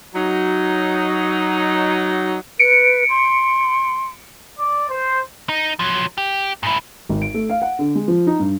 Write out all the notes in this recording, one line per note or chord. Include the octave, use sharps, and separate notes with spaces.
F#3 D#4
B4 C#7 D7
C6
D5
C5
D#4
F3 F#3
G4
G#2 E4
G#1
D7
A3
F5
F#5
D3
G#3
F3
D#4
G2